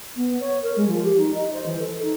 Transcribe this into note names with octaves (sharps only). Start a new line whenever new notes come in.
B3
C#5
A#4
G#3
F3
G4
D#4
D#5
C5
E3
A4
D#4